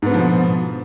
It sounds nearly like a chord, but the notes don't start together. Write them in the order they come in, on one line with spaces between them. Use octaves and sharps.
G#2 B3 D3 F3 B2